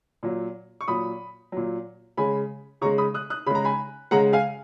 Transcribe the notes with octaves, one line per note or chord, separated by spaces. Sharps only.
A#2 F#3
C#6
A#2 F#3 B5 D#6
A#2 F#3
C#3 G#3 G#5 B5
C#3 G#3 A#5 C#6
B5 D#6
D#6 F#6
D#6 F#6
C#3 G#3 A#5 B5
G#5 B5
C#3 G#3 F#5 A#5
F5 G#5